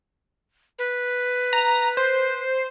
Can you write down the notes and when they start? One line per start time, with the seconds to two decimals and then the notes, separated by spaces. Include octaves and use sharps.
0.78 B4
1.53 A#5
1.97 C5